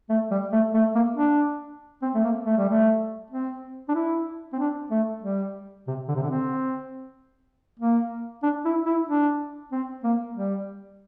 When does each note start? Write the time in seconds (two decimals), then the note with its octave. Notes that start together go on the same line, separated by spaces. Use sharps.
0.09 A3
0.31 G3
0.53 A3
0.74 A3
0.95 A#3
1.16 D4
2.02 C4
2.14 A3
2.24 A#3
2.45 A3
2.57 G3
2.69 A3
3.30 C4
3.89 D4
3.95 E4
4.53 C4
4.59 D4
4.91 A3
5.22 G3
5.88 C3
6.08 D3
6.15 C3
6.23 D3
6.30 C4
7.79 A#3
8.43 D4
8.65 E4
8.86 E4
9.08 D4
9.72 C4
10.04 A#3
10.36 G3